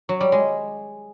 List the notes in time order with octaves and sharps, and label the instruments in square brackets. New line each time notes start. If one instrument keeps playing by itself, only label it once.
[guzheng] F#3
G3
G#3